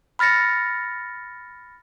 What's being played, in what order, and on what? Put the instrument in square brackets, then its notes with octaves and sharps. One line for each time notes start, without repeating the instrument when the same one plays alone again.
[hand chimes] B5 F6 A6 A#6 C#7